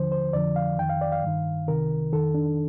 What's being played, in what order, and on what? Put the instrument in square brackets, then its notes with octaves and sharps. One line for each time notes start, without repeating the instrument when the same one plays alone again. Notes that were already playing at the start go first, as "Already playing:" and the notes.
Already playing: [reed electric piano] D#2 D3 F3 C5
C5
F2 D3 F3 D5
F5
F2 D#3 G5
F5
D5
F5
G2 D#3
C2 C3 D#3 A#4
F2 D#3 A4
D4